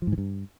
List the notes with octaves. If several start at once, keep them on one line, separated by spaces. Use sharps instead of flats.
F3
G#2
E3
G2